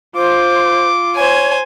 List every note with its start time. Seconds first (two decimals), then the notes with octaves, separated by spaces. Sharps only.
0.16 F4 C5 D6
1.16 C5 C#5 G#5